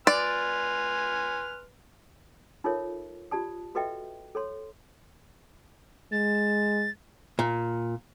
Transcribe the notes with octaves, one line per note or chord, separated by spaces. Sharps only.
B4 D5 G#5 C6 F6
D#4 F4 A4 A#4 C#5 E5
F4 G4 D5 A5 D#6
F#4 A4 B4 D#5 E5 G5
A4 C#5 C6
G#3 A6
A#2